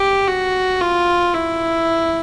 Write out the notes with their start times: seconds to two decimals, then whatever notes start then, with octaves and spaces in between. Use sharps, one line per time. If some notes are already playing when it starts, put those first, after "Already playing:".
Already playing: G4
0.27 F#4
0.81 F4
1.34 E4